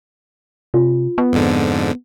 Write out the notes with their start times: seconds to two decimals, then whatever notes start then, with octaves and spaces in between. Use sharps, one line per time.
0.74 C3 F4
1.18 B3
1.33 F2 G#2 D3